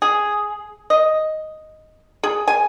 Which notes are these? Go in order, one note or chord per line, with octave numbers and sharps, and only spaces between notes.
G#4
D#5
G#4
G#5